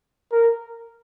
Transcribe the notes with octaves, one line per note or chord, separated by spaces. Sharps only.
A#4